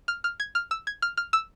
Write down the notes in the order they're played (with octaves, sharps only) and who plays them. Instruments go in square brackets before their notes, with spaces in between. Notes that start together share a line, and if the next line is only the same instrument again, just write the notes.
[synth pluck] F6
F6
G#6
F6
E6
G#6
F6
F6
E6